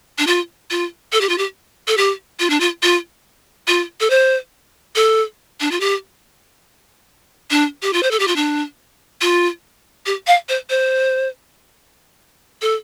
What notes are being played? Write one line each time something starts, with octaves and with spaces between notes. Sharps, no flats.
D4
F4
F4
A4
G4
F4
G4
A4
G4
F4
D4
F4
F4
F4
A4
C5
A4
D4
F4
G4
D4
G4
F4
C5
A4
G4
F4
D4
F4
G4
F5
C5
C5
A4